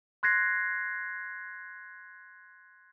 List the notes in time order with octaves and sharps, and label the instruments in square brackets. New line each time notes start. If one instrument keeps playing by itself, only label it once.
[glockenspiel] C6 F#6 G#6 A#6 C7